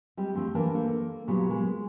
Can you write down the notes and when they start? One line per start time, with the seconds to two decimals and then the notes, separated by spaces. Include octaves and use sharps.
0.17 G3 G#3 C4
0.34 D2 D3 F3 C4
0.55 E3 A#3 D4 A#4 A5
0.74 A#3 A4 C5
1.27 A#2 C#3 F#3 G3 B3 F#4
1.50 G#3